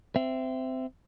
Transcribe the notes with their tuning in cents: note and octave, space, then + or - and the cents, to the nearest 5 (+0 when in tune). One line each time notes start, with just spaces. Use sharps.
C4 -15 E5 +15